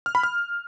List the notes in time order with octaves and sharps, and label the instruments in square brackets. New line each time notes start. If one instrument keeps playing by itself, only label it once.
[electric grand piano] F6
B5
F6